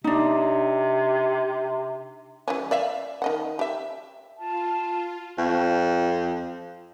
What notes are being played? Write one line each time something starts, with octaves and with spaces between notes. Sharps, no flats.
C3 D4 D#4
E3 G3 C#4
D5 E5 F5
D#3 D#5 F#5
G4 E5
F4 A5
F2